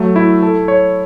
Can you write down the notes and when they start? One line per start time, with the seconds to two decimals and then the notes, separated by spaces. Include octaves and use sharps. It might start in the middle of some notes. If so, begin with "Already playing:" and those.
Already playing: F#3 A3
0.16 E4
0.43 A4
0.68 C#5